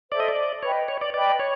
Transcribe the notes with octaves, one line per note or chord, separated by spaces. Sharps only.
A4 C5 D5 E5
D#5
D5
B4 C#5 D#5 G5
C#5
D5
B4 D5 D#5 G5
C#5